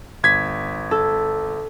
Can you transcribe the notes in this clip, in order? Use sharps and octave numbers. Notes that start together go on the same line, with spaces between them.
G1 G#6 B6
A4